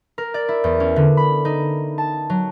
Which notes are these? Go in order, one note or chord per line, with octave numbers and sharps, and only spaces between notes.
A#4
D5
E4
E2
C#4
D3
B5
D#4
A5
F#3